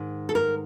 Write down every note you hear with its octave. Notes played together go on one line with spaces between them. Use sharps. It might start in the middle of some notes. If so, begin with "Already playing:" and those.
Already playing: G#2 D#3
A4
A#4